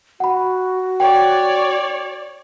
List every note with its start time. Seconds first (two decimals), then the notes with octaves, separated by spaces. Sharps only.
0.20 F#4 F#5 B5
1.00 C#5 D5 G5